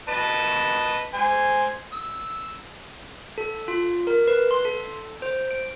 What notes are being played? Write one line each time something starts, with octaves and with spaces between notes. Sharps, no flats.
B4 D#5 A5
C5 G#5
E6
A4
F4
A#4
B4
C6
A4
C5
D7